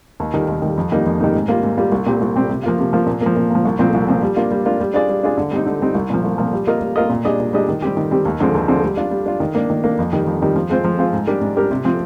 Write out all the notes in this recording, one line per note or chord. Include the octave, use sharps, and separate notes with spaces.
D#2
D#3 G3
D#2
D#3
G3
F2
D#3 G3 A#3 D#4
F2
D#3 G3 A#3 D#4
G#2
G3 A#3 F4
G#2
G3 A#3 F4
C2
A#2 G3 C4 G4
C2
A#2 G3 C4 G4
C3
F3 A#3 F4
C3
F3 A#3 F4
A#2
F3 A#3
A#2
F3 A#3
C2
A#2 F3 C4
C2
A#2 F3 C4
G3
A#3 D4 F4
G3
A#3 D4 F4
G3
D4 F4 G#4 D5
G3
D4 F4 G#4 D5
D3
G3 C4 D#4
D3
G3 C4 D#4
C2
A#2 F3
C2
A#2 F3
G3
A#3 F4 A#4 D#5
G3
A#3 F4 A#4 D#5
A#2
G3 D4 G#4 D#5
A#2
G3 D4 G#4 D#5
D#3
G3 C4 G4
D#3
G3 C4 G4
D#2
D3 F3 G#3 C4
D#2
D3 F3 G#3 C4
G3
D4 F4
G3
D4 F4
D#3
A#3 D4
D#3
A#3 D4
F2
D#3 G3
F2
D#3 G3
F3
G#3 C4 F4 C5
F3
G#3 C4 F4 C5
G#2
G3 D4 G4 A#4
G#2
G3 D4 G4 A#4
C3
F3 C4 F4